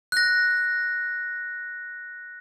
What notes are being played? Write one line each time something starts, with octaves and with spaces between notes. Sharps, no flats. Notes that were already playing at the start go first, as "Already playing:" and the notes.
F#6 A#6